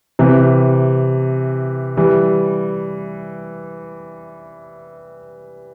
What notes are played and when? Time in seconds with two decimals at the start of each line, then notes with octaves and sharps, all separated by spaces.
0.19 C3 E3
1.97 E3 G3